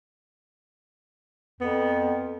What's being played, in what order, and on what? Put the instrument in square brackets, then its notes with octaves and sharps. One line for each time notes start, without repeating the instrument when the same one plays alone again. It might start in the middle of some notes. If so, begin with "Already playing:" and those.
[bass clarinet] F2 [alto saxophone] B3